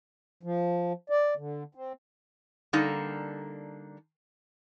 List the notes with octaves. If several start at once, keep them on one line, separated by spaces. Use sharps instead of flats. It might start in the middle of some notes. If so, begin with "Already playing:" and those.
F3
D5
D3
C4
D3 G3 A#3 D#4 A4